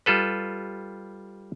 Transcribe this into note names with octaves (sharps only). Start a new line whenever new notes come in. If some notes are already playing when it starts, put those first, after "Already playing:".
G3 F4 A4 B4